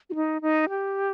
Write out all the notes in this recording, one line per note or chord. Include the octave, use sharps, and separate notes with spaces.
F#4
D#4
D#4
G4